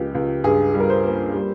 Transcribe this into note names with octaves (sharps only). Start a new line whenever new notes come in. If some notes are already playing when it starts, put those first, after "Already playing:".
Already playing: C#2 F3 G#3 G4
C#2
G2 G#4
G3
A#4
C5
A#3
G3